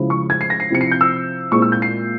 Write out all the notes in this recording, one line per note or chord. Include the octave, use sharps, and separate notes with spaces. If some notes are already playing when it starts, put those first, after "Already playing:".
Already playing: C#3 F3 G#3 E4
C#6
G#6
C7
A#6
C7
C3 F3 C4 E4 C#7
C7
G6
E6
A#2 G#3 C4 E4 C#6
E6
G6
C7